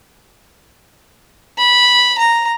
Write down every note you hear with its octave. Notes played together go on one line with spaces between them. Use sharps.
B5
A#5